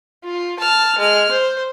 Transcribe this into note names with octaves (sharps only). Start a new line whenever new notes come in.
F4
A5 F6
G#3 F6
C5